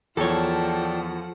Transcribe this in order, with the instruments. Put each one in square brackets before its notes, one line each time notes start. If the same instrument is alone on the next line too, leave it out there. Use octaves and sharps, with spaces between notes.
[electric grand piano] E2 [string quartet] F3 F#5 [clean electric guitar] A4 C#5 [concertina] D5 G5 A5